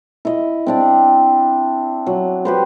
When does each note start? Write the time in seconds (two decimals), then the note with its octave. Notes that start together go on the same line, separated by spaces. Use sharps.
0.25 E4 D#5
0.66 C4 D4 D5
2.06 F#3
2.45 G4 B4 C5